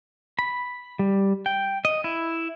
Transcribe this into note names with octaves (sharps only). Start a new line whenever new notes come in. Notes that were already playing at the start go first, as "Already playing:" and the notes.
B5
G3
G5
D#5
E4